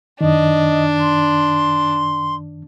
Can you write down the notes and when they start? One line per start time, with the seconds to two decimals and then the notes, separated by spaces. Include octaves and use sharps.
0.21 F#2 D#3 D4 D#5
1.00 C6